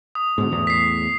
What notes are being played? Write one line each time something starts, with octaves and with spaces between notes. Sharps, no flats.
D#6
G#2 B2 D3
E2 A2
B6 C7